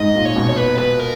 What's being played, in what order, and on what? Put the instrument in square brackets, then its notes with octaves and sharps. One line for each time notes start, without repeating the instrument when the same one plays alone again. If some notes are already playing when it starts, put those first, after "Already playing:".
Already playing: [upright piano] G#2 [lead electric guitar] D#5
[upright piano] A#2
[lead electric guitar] C#5
[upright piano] B2
[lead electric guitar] C#5
B4
B4
A#4